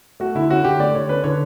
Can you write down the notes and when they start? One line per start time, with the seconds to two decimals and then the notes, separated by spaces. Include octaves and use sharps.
0.20 A3 F#4
0.35 D3 E4
0.50 C#4 F#4
0.64 D3 G4
0.79 A3 D5
0.94 D3 C#5
1.09 C#4 B4
1.24 D3 C#5